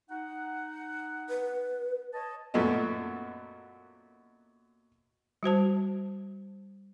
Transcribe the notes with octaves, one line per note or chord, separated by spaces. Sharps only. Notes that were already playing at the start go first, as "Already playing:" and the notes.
D#4 F#5
B4
C#5 D#5 A5
F#2 A#2 A3 B3 D#5
G3 F#4 C5 A5